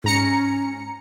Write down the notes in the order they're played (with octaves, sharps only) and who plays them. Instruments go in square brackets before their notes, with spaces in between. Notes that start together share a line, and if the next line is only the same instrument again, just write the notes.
[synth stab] G#2 A#5 C#7 [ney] C#4